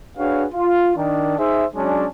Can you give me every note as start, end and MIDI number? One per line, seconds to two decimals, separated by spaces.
0.18 0.45 62
0.18 0.45 66
0.18 0.45 68
0.18 0.45 71
0.18 0.45 73
0.18 0.45 77
0.53 0.93 65
0.97 1.38 51
0.97 1.38 62
1.38 1.65 63
1.38 1.65 68
1.38 1.65 72
1.38 1.65 76
1.75 2.06 54
1.75 2.06 56
1.75 2.06 61
1.75 2.06 62